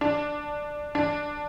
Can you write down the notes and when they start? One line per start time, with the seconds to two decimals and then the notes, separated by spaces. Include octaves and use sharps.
0.01 D4
0.95 D4